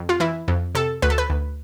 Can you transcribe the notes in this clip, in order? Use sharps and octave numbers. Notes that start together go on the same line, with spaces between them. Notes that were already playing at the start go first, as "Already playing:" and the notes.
Already playing: F2
F4
E3 E4
F2
C3 A4
D2 B4
A4
B4
D2